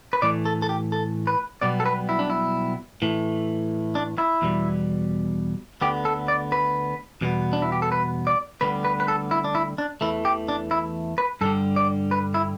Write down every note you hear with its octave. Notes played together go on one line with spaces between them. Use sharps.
B4
A2 E3 A3 D5
A4
A4
G4
A4
B4
B1 B2 G3 B3 D5
A4
B4
E4
D4
E4
A2 E3 A3
D4
E4
E2 B2 G3
D2 D3 B3 G4
A4
D5
B4
E2 B2 G3 B3
D4
E4
G4
A4
B4
D5
D2 D3 G3 B3 B4
B4
B4
A4
E4
D4
E4
D4
E2 E3 A3 E4
G4
D4
E4
B4
G2 D3 G3 A4
D5
B4
E4